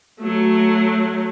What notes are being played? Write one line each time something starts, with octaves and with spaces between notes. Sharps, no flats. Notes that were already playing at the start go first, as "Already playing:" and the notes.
F#3 A3